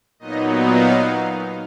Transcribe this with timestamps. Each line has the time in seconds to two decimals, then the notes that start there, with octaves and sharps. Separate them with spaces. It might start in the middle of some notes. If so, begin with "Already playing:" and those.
0.19 A#2 F#3 B3 D#4 D#5
0.65 F5